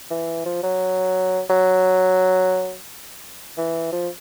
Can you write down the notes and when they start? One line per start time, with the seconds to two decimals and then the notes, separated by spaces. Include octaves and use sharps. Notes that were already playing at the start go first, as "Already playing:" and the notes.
0.11 E3
0.46 F3
0.63 F#3
1.50 F#3
3.58 E3
3.93 F3